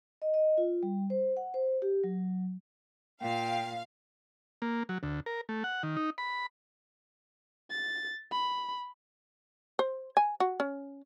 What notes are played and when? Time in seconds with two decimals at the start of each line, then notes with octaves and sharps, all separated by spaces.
0.22 D#5
0.34 D#5
0.58 F4
0.83 G3
1.10 C5
1.37 F#5
1.54 C5
1.82 G4
2.04 F#3
3.21 A#2 F5 G5
4.62 A#3
4.89 F#3
5.03 D2
5.26 A#4
5.49 A3
5.64 F#5
5.83 D#3
5.97 D#4
6.18 B5
7.70 A6
8.32 B5
9.79 C5
10.17 G#5
10.40 F#4
10.60 C#4